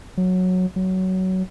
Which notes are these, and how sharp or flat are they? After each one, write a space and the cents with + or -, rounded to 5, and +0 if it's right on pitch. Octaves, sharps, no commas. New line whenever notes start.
F#3 -10
F#3 +15